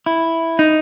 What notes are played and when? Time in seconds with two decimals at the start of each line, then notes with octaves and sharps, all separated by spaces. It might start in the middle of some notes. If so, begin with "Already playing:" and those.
0.06 E4
0.59 D#4